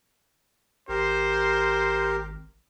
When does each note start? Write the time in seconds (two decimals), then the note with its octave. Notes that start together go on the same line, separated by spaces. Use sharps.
0.89 G#1 G4 A#4 C5